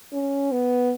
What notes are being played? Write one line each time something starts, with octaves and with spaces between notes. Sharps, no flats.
C#4
B3